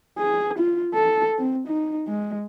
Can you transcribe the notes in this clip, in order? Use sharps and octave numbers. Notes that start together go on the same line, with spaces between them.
G#4
F4
A4
C4
D#4
G#3